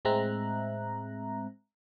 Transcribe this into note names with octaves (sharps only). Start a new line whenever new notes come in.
A2 G#3 C4 E5 A#5 F#6